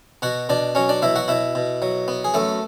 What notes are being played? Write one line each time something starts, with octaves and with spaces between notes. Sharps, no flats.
B2 F#4 F#5
B2 D4 D5
F#3 C#4 C#5
D4 D5
B2 E4 E5
F#4 F#5
B2 E4 E5
B2
F#3
B3
G#4
F#2 A3 A4